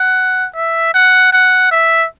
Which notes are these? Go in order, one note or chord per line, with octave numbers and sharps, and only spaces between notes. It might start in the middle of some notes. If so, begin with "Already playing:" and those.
Already playing: F#5
E5
F#5
F#5
E5